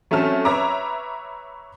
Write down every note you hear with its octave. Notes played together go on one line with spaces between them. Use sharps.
F#3 A3 C4 C#4 A5 F6
B4 C#5 E5 A#5 D6